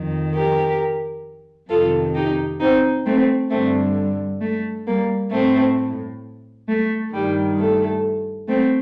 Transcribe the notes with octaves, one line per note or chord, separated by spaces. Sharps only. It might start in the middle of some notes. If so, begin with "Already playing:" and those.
Already playing: F2 D#3
G4 A#4
F2 C3 D#3 F4 A4
D#4 G4
C4 D#4
A3 C4
G2 D3 A3 C4
A3
G3 A#3
A2 A3 C4
A3
G2 D#3 G3
A3
A3 C4